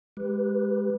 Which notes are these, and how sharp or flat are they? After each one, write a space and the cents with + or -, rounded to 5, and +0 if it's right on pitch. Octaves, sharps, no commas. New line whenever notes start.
G#3 +0 G4 +0 B4 +0